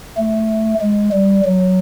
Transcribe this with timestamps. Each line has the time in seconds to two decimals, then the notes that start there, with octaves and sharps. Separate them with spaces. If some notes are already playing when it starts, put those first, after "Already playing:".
0.18 A3
0.81 G#3
1.13 G3
1.45 F#3